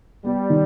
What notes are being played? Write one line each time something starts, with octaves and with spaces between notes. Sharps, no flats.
G3 B3
D#3